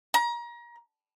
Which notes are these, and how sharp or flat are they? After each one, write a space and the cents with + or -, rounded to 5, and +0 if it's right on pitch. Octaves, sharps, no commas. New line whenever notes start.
A#5 +30